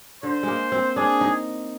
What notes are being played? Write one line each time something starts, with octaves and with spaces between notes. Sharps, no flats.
D3 C5
G#3 A#3
C4
D4 G#4
D#4